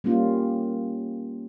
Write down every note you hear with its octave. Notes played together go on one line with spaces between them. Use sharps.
G3 A#3 C#4 F4